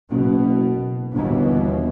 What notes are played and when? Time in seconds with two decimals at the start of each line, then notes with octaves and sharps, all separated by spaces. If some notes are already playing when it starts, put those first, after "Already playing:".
0.10 F#1 B2
1.13 G1 D#2 B2 E3